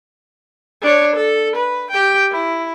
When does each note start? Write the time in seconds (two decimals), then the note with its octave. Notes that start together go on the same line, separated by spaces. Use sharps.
0.82 D4 C#5
1.16 A4
1.56 B4
1.91 G4 G5
2.31 E4